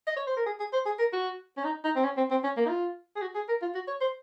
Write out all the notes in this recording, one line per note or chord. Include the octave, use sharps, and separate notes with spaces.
D#5
C#5
C5
A#4
G#4
G#4
C5
G#4
A#4
F#4
C#4
D#4
D#4
C4
C#4
C4
C4
C#4
A#3
D#4
F4
G#4
F#4
G#4
A#4
F4
F#4
C#5
C5